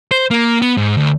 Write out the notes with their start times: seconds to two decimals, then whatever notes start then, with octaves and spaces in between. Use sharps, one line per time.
0.11 C5
0.31 A#3
0.62 B3
0.77 G#2
0.97 D2